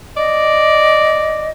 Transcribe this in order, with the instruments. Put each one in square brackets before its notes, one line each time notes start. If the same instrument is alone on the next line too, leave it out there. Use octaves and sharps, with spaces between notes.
[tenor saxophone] D5 [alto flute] D#5